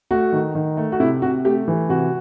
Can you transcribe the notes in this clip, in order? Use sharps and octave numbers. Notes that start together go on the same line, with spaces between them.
A3 F#4
D#3
D#3
A3
F#4
C3 E4
C3 F#4
A3 G4
E3
C3 F#4